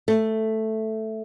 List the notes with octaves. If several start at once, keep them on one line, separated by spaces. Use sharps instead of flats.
A3